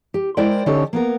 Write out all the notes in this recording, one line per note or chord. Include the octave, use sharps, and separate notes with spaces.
G4
G#3 E4 A#4 C5 D5 G5
D3 C#4 D#4 G4 A4 C#5
A#3 B3 A#4